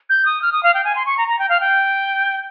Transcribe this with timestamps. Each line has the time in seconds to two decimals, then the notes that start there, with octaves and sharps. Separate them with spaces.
0.10 G6
0.25 D#6
0.42 F6
0.53 D#6
0.63 F5
0.74 G5
0.84 G#5
0.96 C6
1.06 C#6
1.18 A#5
1.28 A#5
1.39 G5
1.49 F5
1.60 G5